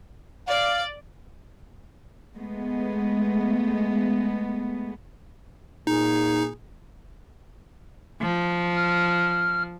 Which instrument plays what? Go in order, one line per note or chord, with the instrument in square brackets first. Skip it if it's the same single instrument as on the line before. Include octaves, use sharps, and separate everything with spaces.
[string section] D5 [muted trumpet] F5
[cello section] G#3 A3 B3
[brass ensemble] A#2 G#4 [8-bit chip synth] D#4
[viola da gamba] F3
[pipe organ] F6